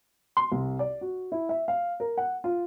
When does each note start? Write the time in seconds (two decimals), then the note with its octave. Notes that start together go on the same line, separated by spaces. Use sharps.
0.37 C6
0.52 C2
0.79 D5
1.01 F#4
1.32 E4
1.49 E5
1.68 F5
2.00 A#4
2.17 F#5
2.44 F4